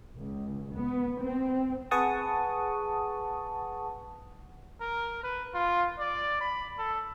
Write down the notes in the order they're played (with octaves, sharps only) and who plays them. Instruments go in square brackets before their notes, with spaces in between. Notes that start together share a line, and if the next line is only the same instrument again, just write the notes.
[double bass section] C#2
B3
C4
[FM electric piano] G#4 B4 F#5 A5 C#6 D#6
[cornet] A#4
B4
F4
D5
B5
A4